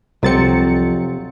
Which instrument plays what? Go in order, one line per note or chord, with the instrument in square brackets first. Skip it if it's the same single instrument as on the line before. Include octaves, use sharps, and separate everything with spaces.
[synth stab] C2 A6 C#7 [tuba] F2 [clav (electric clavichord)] C3 [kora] F#3 C4